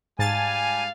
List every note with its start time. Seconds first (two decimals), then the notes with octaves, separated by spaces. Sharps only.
0.19 G#2 G3 F5 G#5 A5 A6